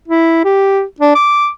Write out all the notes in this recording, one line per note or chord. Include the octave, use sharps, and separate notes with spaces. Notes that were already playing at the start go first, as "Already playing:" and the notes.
E4
G4
D4
D6